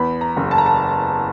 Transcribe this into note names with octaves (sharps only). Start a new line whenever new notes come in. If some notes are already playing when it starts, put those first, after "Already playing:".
Already playing: E2 B5
A#5
F#1
A5
A#5
A5